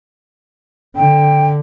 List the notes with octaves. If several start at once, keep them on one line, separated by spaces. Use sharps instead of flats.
D3 G5